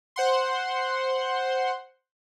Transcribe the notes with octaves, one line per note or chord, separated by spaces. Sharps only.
C5 F#5 C6